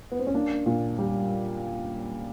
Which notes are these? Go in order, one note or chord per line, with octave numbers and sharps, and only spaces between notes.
B3
C4
C#4
A#3 D4
A#2
G3